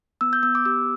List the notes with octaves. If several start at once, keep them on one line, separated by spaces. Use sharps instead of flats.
B3 E6
G6
B3 E6
D6
G4 E6